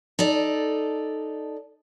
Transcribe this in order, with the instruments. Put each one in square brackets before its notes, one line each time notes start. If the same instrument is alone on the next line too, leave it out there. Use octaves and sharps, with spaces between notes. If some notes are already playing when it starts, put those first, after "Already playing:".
[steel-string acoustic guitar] D#4 A4 D5